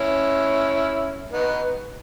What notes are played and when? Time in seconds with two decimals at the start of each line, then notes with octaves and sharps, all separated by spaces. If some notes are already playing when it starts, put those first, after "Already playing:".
Already playing: C#4 E4
1.32 B3 D#4